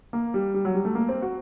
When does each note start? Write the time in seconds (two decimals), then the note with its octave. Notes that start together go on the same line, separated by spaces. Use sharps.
0.13 A#3
0.34 G3
0.54 G3
0.65 F#3
0.75 G3
0.85 A3
0.95 A#3
1.09 C4
1.22 F#4